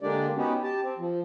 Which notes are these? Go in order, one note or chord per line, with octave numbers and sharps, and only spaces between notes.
D3 G#3 A#3 D4 G4 D5
B3 C#4 D#4 F#4 G4
G4 A5
C4
F3